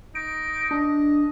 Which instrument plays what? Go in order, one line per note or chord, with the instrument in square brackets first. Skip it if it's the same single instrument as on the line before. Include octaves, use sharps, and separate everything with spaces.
[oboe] D#4 [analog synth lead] D7
[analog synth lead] D4 [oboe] D#5